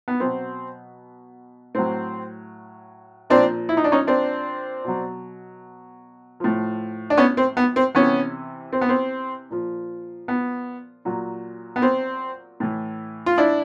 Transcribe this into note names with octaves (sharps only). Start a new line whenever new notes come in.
B3
B2 F#3 C4
A2 F#3 C4
A#2 F3 C4 D4
E4
D#4
D4
C#4 D#4
C4 D4
B2 F#3
A2 F3
D4
B3 C#4
C4
B3
C4
C3 E3 B3 C#4
C4
B3
C4
A#2 F3
B3
A#2 F#3
B3
C4
A2 E3
F4
D4 E4